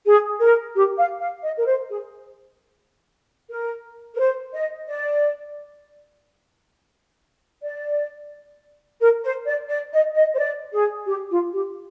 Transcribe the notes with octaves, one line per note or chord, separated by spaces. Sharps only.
G#4
A#4
G4
F5
F5
D#5
A#4
C5
G#4
A#4
A#4
C5
D#5
D5
D5
A#4
C5
D5
D5
D#5
D#5
C5
D5
G#4
G4
F4
G4